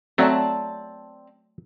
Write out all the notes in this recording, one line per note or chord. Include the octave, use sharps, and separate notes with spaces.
F#3 A3 C4 D5 A5